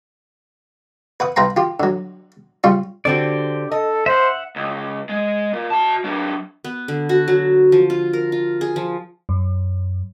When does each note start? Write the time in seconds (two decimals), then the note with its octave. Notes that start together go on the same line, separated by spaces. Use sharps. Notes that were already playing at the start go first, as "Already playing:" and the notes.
1.20 B4 F#5 D#6
1.36 C2 B4 G5 A#5 C6
1.57 F4 G4
1.80 D3 F#3
2.64 C#3 G3 F4 C#6
3.05 D3 C4 F#4 G4 D5
3.71 A4 D#5
4.06 C5 E5 F#5
4.56 C#2
5.09 G#3
5.53 A#2
5.70 F#4 A5
6.04 F#3 D4
6.64 B3
6.88 D3
7.09 F#4
7.28 F#3
7.72 F3
7.90 F4
8.13 A#4
8.32 F4
8.61 G#4
8.76 F3
9.29 F#2